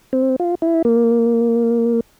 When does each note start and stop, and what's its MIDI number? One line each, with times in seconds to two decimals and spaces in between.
0.13 0.36 60
0.40 0.55 65
0.62 0.82 64
0.85 2.00 58